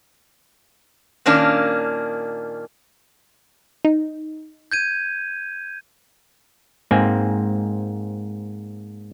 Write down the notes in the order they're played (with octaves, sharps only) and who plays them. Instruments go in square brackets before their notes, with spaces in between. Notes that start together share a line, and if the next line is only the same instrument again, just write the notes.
[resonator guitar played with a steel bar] A#2 D#3 A#3 C#4 D4
[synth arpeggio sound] D#4
[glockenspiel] G6 G#6 D#7
[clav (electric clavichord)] G#2 A#3 C4 G#5